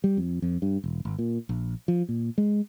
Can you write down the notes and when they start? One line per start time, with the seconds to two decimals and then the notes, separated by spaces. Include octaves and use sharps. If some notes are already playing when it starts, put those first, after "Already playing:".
0.04 G3
0.17 F2
0.42 F2
0.62 G2
0.84 E1
1.05 G#1
1.19 A#2
1.49 A#1
1.88 F3
2.09 A#2
2.38 G#3